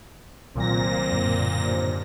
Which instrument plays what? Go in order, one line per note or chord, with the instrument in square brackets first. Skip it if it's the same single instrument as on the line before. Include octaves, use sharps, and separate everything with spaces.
[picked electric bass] C2 D#3 F#3 [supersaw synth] A#2 A#6 [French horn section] A#3 C4
[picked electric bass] F#2 A2 D3
[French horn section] D#2 D4 C5